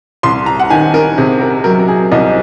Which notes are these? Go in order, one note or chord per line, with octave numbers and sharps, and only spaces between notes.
C2 C6
A#5
F#5
D#3 G#5
A#4
C3 G#4
A#4
F#3 A#4
A#4
G#4
C2 D#5